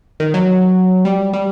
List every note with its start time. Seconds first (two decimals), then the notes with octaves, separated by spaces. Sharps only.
0.20 D#3
0.34 F#3
1.05 G3
1.33 G3